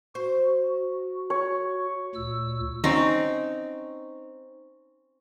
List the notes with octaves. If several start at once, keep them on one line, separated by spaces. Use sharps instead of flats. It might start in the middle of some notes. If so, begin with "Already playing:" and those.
F#4 C5
C#5
D2 A#2 E6
C4 C#4 D#4